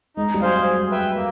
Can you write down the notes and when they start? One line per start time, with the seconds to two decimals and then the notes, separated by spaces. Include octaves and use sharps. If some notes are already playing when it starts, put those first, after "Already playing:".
0.17 G#3 D#4
0.34 G3
0.41 F#3 G#4 C5 F5
0.66 G#4
0.91 B4 E5 G5
1.16 A#3